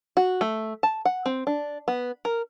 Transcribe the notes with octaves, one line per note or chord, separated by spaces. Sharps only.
F#4
A3
A5
F#5
C4
D4
B3
A#4